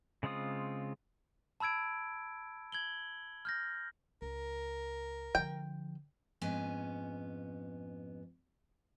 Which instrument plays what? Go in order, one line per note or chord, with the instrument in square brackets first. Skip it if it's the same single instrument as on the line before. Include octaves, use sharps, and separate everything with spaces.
[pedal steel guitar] C#3 G#3 C4 F4 D#6
[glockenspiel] A5 B5 E6 G#6 D7
G#6 F#7 G7
F6 G6 A#6
[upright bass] C#2 [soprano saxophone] A#4
[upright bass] D3 F3 [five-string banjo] G5
[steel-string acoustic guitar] F2 G#2 B3 C#4 G#5